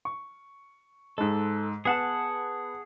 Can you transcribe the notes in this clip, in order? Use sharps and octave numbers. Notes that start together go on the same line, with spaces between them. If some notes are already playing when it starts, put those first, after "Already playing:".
C#6
G#2 G#3 A4
B3 G#4 F#5 A5